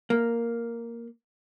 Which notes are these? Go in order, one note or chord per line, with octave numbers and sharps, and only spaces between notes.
A#3